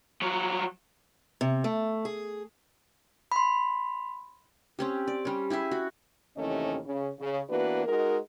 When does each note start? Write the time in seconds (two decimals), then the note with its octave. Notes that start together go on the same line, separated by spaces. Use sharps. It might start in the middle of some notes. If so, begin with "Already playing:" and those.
0.22 F3 F#3
1.41 C3
1.64 A3
2.05 G#4
3.32 B5 C6
4.79 C4 C#4 G4
5.08 D5
5.25 G3 C#4
5.50 E4 G4 G#4 E5
5.71 F#4
6.37 D#2 C3 E3 A3 C#4 D#5
6.85 C#3
7.20 C#3
7.50 E3 A#3 B3 D4 F#4 B4
7.85 G#3 D#4 F#4 A#4